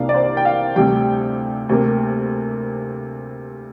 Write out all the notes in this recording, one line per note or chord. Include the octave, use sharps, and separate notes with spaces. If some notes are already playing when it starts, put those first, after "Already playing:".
Already playing: C2 C3 A#3 D4 F5
D5
C5
G5
F5
D2 C3 G3 G5
D2 C3 A#3